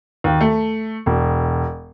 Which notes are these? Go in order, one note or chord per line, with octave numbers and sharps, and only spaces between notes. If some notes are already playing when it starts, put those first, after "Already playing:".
D#2
A3
E1